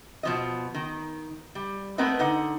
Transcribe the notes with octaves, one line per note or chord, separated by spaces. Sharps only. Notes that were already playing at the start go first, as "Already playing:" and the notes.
B2 F3 D#5
D#3
G3
A3 B3 C4 A#4 B4 D#5
D3 D#4 F#5